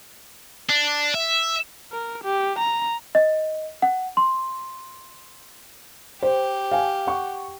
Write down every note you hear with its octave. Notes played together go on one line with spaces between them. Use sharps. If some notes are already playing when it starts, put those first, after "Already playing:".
D4
E5
A#4
G4
A#5
D#5
F#5
C6
G4 C5
F5 G#5
F#5 C#6